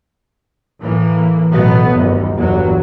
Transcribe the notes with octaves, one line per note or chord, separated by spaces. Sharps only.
A2 E3 A#3
A1 B2 F#3 A3 B3
G1 D#2
G1 E2 A#2 F#3